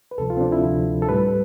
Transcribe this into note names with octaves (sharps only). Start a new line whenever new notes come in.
B4
D2 C3 F3 A4
F4
C4
D4
E4
D2 C3 F3
A4
A2 G3 B4